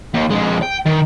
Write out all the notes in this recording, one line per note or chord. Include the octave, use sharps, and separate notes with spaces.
D#2
F2 G#3
G5
D#3